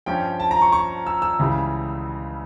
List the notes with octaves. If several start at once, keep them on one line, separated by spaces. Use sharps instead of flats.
G2 F3 C#4 G5
A5
A#5
C#6
C#6
E6
E6
C#2 C#3 E3 G3